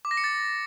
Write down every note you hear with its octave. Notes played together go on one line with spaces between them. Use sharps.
D6
A#6
C#7
A6